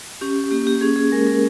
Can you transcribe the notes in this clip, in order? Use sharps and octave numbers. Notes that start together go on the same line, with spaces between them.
C#4 G4
A#3 G4
G4
C#4 G#4
G#4
G#3 A#4
A#4